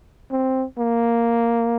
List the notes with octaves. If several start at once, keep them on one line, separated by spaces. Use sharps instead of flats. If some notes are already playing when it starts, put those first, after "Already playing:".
C4
A#3